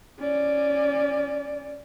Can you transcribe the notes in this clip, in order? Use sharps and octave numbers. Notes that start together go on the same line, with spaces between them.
C#4 D5